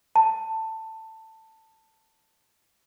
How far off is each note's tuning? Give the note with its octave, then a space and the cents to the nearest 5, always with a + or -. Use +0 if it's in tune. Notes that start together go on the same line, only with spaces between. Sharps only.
A5 +15